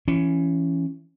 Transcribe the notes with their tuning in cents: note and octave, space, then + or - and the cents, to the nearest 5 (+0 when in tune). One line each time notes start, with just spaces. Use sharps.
E3 +20 C#4 +0